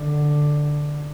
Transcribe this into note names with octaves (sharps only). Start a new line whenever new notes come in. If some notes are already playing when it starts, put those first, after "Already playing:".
Already playing: D3